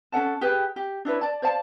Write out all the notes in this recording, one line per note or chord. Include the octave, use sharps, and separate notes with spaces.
C#4 A4 F#5 A5
G4 G#4 B4 G5
G4
D4 E4 B4 C#5
D5 A5
C5 D5 F5 A5